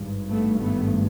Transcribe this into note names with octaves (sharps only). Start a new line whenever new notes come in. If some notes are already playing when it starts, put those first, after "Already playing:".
Already playing: G#1 G2
A3 B3
A3 B3